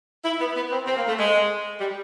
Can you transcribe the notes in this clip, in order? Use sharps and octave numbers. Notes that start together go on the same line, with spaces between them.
E4
B3
B3
C4
C4
A#3
A3
G#3
G3